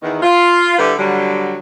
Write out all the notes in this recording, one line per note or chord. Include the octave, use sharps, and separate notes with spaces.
E2 D#3
F4
D3 G3 E4 G4 A4 B4
D3 F#3 G3